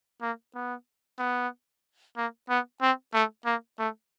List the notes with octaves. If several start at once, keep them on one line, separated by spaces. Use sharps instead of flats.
A#3
B3
B3
A#3
B3
C4
A3
A#3
A3